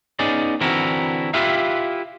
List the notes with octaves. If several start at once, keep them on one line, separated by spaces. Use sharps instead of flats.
B3 C#4 D#4 G#4 D5
D3 E3 C4 E4 F#4 A#4
E4 F4 G4 B4 E5 F5